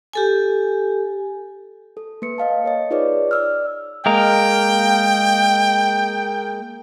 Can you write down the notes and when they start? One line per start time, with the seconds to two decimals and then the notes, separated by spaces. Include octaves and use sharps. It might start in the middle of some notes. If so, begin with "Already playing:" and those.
0.13 G4 A4 G#5
1.97 A4
2.22 A#3 B4 C#7
2.38 D#5 F5 A5
2.64 A#4 C#5 D#5
2.90 D#4 F4 G#4 B4 C#5 D5
3.31 D5 E6 F6
4.06 G#3 A#3 A#4 G5